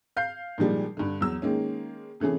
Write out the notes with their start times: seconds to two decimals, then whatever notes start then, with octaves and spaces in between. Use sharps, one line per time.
0.17 F5 G6 C7
0.58 A#2 D#3 F3 G3 G#3
0.97 G2 D3
1.21 E2 F#3 E6
1.42 D#3 G#3 A#3 C#4
2.20 C3 E3 A3 C#4 G#4